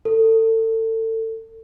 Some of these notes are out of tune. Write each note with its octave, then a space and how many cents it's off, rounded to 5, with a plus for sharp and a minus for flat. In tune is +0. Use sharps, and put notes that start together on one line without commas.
A4 +30